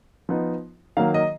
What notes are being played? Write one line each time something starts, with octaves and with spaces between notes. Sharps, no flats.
F3 B3 D#4
D#3 F#3 A#3 F5
D#5